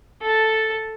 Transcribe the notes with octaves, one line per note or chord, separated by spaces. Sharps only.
A4 A5